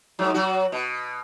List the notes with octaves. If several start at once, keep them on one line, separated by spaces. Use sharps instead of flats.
G#2 F#3
F#3 F#4
B2